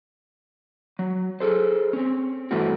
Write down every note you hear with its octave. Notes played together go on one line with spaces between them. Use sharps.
F#3
G#4 A4 C5
C4 C#4
G2 B2 E3 A3 C4 F#4